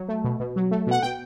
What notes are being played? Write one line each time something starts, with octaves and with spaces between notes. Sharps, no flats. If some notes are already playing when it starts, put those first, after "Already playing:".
Already playing: F#3
A3
B2
B2
F#3
A3
B2 F#5
B2 G5